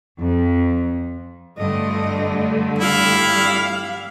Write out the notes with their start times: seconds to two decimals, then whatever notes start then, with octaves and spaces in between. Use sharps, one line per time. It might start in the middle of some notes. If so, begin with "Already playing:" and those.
0.19 F2
1.58 G2 D3 A3 D#5
2.79 G3 E4 F5